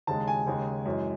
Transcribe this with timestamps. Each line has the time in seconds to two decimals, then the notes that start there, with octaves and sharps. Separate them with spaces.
0.07 D#2 C#3 G#3 A5
0.28 G#5
0.47 D#2 C#3 G#3
0.86 F#2 E3 G#3